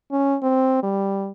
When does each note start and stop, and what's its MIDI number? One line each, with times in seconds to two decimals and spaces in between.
0.12 0.37 61
0.43 0.78 60
0.83 1.31 55